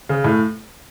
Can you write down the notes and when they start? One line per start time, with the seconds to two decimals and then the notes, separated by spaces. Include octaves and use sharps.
0.09 C#3
0.24 A2